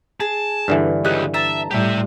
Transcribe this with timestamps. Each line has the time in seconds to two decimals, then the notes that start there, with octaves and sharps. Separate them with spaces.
0.20 G#4 A5
0.68 G2 D3 E3
1.05 C#2 C#3 D#4 G4 F#6
1.34 E5 A5 A#5
1.71 A2 G3 G4 E5